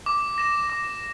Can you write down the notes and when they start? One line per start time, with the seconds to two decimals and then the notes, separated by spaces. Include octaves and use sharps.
0.06 D6
0.38 A#6 E7
0.70 D6